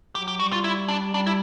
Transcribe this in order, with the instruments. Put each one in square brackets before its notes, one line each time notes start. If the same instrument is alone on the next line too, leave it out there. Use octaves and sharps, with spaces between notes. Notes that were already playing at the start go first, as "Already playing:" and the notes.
[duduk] F#3 [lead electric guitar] G4
[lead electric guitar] G4
[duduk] G3 [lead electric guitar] F#4
[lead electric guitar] F4
E4
D4
[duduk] G3 [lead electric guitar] D4
[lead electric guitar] E4